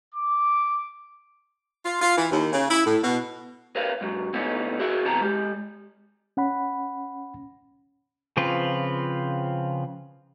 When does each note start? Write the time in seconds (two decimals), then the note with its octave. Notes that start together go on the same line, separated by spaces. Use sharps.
0.14 D6
1.85 F4
2.02 F4
2.17 E3
2.31 D#2
2.53 C#3
2.70 E4
2.86 A2
3.03 B2
3.76 A#4 B4 C#5 E5 F5
4.01 G#2 F#3
4.33 D2 A2 A3 B3 C#4 D#4
4.80 F#4 G#4 A#4 C#5 E5
5.05 C3 E3 B3 A5 A#5
5.21 G#3 G4
6.37 C#4 F#5 B5
8.37 C#3 F3 C4 F4 B4